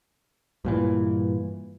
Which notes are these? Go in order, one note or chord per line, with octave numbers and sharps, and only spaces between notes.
G2 A#2 E3